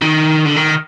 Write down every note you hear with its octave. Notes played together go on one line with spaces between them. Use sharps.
D#3
D3
D#3